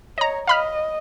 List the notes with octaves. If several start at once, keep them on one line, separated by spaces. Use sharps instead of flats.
C#5 D#5 A#5
D#5 F5 B5 F6